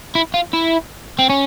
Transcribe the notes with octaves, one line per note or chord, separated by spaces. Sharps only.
E4
F4
E4
C4
C#4